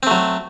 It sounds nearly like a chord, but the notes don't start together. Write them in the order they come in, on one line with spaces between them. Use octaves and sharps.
C4 A3 F#3